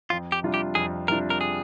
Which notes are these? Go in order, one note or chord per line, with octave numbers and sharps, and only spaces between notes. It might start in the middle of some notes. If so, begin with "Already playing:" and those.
F2 F4
G4
C3 G3 D4 F4
G4
F2 G#4
C3 G3 D4 F4 A#4
A#4
G#4